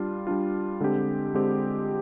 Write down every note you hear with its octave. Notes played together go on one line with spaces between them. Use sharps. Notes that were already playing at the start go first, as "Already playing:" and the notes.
Already playing: G3 D4 F4
G3 D4 F4
D3 G#3 C4 G4
D3 G#3 C4 G4